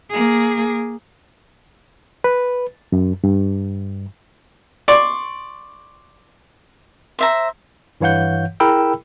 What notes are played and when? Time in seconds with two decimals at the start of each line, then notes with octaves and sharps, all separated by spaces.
0.10 A#3 G#4
2.24 B4
2.92 F#2
3.24 G2
4.88 D5 C6 C#6
7.19 C5 E5 A#5
8.01 G2 E3 C#5 F5 F#5 G6
8.60 E4 G#4 A#4 G5 B5 E6